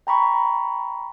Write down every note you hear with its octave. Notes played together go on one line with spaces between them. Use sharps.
G5 A#5 B5 C#6